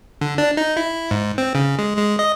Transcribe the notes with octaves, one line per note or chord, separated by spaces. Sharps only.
D3
D4
D#4
E4
G#2
C4
C#3
G#3
G#3
D#5